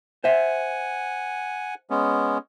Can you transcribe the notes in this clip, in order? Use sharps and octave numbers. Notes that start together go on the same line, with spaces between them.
C5 E5 F#5 G#5
G#3 B3 C#4